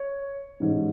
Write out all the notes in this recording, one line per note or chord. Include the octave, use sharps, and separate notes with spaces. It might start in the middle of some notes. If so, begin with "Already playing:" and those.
Already playing: C#5
A1 G#2 E3